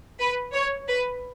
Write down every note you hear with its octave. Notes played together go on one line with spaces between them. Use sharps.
B4
C#5
B4